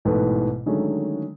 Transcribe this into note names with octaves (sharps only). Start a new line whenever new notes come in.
A1 G#2 B2 E3 A4 B4
D3 D#3 F#3 G#3 A3 C#4